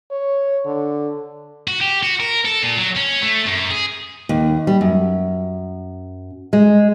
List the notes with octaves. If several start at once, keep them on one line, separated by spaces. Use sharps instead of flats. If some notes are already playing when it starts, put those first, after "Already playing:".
C#5
D3
F#4
G4
F#4
A#4
A4
A#2
F#3
C#4
A3
F#2
G#4
D#2
G3
F#2
G#3